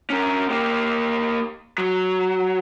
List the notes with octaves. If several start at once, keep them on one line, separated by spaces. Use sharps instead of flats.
C#4 A#4
A#3 G4
F#3